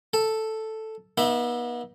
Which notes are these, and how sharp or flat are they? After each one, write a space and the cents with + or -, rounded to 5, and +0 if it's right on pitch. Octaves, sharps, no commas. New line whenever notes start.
A4 +0 A5 +0
B3 -40 D#4 +5 E5 +0